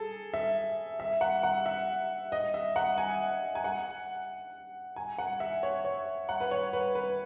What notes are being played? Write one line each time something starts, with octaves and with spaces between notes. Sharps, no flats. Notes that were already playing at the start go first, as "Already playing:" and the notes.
Already playing: G#4 A4
E5
E5
F#5
F#5
E5
D#5
E5
F#5
G#5
G#5
F#5
G#5
F#5
E5
C#5
C#5
F#5
B4
C#5
B4
B4